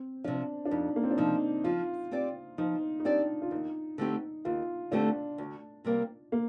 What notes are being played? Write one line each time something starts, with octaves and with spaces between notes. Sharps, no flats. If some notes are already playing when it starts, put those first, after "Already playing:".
Already playing: C4
C3 F3 D4
D4
F2 D#4
A#3
C4
D4
C3 F3 D#4
F3 F4
C4 G4 D5
F3 D#4
D#4
C4 D4 G4 D5
F4
D#2 D#4
D3 A3 C4 D#4 G4
D#2 F4
D3 A3 C4 D4 G4
D2
C3 G3 A#3
A#3